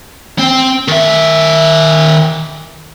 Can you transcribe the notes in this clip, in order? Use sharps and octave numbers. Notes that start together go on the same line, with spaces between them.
C4
D#3 E5